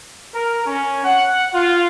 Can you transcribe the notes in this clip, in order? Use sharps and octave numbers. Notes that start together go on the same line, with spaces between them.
A#4
C#4
F#5
F4